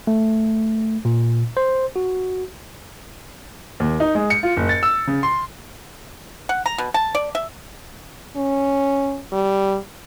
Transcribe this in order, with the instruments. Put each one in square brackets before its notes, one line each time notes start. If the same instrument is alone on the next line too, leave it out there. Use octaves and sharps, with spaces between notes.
[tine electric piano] A3
A#2
C5
F#4
[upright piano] D#2
D#4
G#3
C#7
F4
F#1
A6
E6
C#3
C6
[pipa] F#5
A#5
B2
A5
D5
E5
[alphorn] C#4
G3